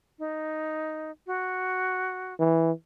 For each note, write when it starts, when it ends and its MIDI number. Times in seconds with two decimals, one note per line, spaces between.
0.19 1.11 63
1.27 2.34 66
2.40 2.72 52